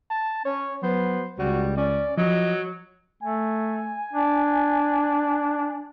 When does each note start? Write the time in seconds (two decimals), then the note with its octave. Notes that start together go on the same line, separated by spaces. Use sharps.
0.11 A5
0.45 C#4 C#5
0.83 F#3 B3 C5
1.39 C#2 G3 F#4
1.77 C#4 D5
2.17 F3 F#3 D#5
3.23 A3 G#5
4.13 D4